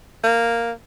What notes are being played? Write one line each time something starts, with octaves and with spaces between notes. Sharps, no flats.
A#3